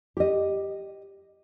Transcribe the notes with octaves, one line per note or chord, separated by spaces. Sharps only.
G4 D#5